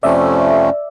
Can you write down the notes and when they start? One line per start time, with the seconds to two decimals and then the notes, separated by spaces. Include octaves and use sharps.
0.03 F2 C3 F3 A3 C#4 D5 E5